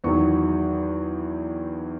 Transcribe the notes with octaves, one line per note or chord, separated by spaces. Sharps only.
E2 D#3 F#3 C#6